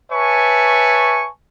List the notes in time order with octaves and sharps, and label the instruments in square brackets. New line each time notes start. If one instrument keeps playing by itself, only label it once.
[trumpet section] B4 C#5 E5 G#5 A5 C#6